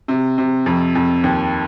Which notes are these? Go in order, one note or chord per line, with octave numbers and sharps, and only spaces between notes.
C3
C3
F2
F2
D#2